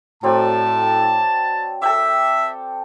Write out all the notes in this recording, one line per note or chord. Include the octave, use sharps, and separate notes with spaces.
A2 F#3 C4 D5 A5
A4 E5 G5 D6